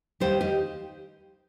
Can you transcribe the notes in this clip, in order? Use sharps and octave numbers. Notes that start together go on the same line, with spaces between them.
D#2 D#3 G3 G4 C5
D#4 G4